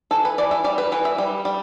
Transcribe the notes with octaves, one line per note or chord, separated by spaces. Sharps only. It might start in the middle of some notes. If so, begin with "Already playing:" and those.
E3 A4
B4
E3 D5
E5
G3 D5
B4
E3 B4
E5
G3
G3